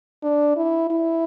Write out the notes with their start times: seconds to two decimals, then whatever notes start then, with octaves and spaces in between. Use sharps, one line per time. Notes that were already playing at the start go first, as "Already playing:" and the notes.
0.23 D4
0.56 E4
0.90 E4